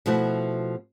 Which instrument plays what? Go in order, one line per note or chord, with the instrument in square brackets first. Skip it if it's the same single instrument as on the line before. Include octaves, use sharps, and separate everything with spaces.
[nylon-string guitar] B2 F3 A3 E4 F#4